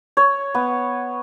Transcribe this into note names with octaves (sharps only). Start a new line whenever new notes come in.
C#5
B3